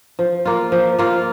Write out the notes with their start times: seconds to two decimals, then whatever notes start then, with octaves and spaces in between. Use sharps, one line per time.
0.19 F3
0.45 A#3 F4
0.72 F3
0.99 A#3 F4